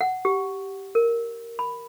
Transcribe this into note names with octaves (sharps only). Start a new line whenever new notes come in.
F#5
G4
A#4
B5